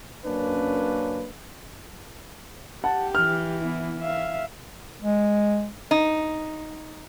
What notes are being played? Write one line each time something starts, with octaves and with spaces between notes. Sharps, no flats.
F#2 A#3 C#4 D4 B4
G4 F#5 A5
E3 F6
B3 E4
E5 F5
G#3
D#4